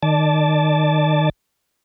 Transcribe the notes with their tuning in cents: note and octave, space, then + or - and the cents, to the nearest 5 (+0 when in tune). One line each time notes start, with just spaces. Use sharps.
D#3 -20 D5 +0 A5 -10